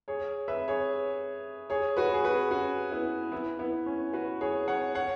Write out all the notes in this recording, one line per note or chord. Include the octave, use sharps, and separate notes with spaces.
G#4 C#5
B4 E5
G#4 C#5
G#4 C#5
F#4 B4
G#4
F#4 B4
C#4 F#4
B3 E4
B3 E4
B3 E4
C#4
F#4 B4
G#4 C#5
C#5 F#5
C#5 F#5